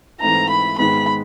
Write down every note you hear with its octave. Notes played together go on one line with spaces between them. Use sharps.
G#2 E3 A3 C4 E4 A#5
B5
G#2 D#3 G#3 B3 B5